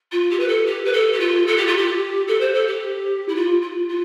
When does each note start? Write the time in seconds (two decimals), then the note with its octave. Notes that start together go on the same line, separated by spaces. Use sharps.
0.11 F4
0.30 G4
0.39 B4
0.47 A4
0.66 G4
0.84 B4
0.92 A4
1.12 G4
1.19 F4
1.46 A4
1.57 G4
1.66 F4
1.76 G4
2.27 A4
2.40 C5
2.53 A4
2.67 G4
3.28 E4
3.34 F4
3.61 F4
3.88 F4